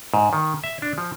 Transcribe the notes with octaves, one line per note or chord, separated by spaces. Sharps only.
G#2
D#3
E5
D4
F3